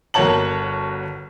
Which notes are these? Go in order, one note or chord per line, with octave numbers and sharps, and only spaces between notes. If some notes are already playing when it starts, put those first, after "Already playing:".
G1 F#4 A#4 C#5 A5 F#7